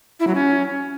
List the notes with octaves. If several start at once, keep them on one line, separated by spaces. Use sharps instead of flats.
E4
F#3
C#4